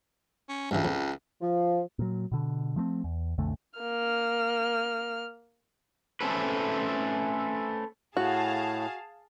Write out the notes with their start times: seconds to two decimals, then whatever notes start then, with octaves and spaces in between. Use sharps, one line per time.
0.49 C#4
0.71 C#2 G2 E3
0.85 F2
1.41 F3
1.99 A#2 F#3
2.32 B2 D3
2.76 F3 A3 B3 C4
3.04 E2
3.38 B1 F2 D3 A3
3.80 A#3 F6
6.21 A3 C4 C#4 A4 B4
8.17 A2 F#4 G#4 F5 A5